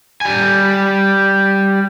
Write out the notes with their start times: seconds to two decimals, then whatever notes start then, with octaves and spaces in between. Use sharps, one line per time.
0.21 G3 G#5